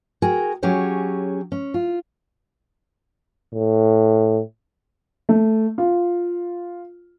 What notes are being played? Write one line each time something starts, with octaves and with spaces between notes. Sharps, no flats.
F#4 G#4 A#4 G5
F#3 C#4 G4 G#4 C#5
C#4
F4
A2
A3
F4